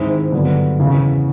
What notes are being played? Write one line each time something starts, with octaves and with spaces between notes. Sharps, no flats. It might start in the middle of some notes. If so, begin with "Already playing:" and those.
Already playing: G#2 D#3 G#3 C4 E4
G2 D3 F#3 B3
E2 C#3 E3